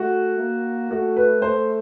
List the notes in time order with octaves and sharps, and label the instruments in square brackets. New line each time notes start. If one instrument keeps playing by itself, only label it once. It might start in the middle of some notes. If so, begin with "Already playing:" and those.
Already playing: [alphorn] A3 [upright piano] F#4
[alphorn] A#3
[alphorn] A3 [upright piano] F#4
[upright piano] B4
[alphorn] A3 [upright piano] C5